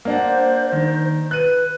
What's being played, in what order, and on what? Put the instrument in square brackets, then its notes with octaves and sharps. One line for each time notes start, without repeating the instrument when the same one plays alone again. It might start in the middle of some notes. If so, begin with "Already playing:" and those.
[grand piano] A#3 D4 F#5 [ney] C5
[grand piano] D#3
[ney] B4 [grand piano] F#6 D#7